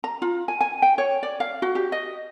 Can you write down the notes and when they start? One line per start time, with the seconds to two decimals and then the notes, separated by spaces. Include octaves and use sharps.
0.04 A#5
0.22 F4
0.48 G#5
0.61 G#5
0.82 G5
0.98 C#5
1.23 D5
1.40 F5
1.62 F#4
1.75 G4
1.92 D#5